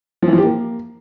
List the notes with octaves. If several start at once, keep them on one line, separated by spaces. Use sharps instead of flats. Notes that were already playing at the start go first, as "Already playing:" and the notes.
F3
E3
F3
G4
A#3